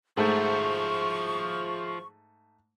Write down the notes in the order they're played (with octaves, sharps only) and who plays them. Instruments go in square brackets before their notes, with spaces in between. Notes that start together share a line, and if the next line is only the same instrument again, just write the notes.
[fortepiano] G#2 A3 [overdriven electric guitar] F3 F#4 [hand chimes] G#4 E5 G6 [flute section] C#6